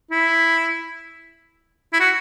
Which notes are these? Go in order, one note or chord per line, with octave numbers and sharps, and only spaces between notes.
E4
E4
F#4